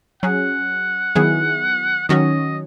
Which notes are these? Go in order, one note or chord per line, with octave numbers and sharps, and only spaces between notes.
F#3 C#4 G#4 F#5
D#3 F#3 B3 E4 G#4
D#3 F#3 C#4 F#4 C#5 D#5